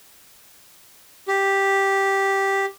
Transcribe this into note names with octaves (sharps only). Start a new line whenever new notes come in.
G4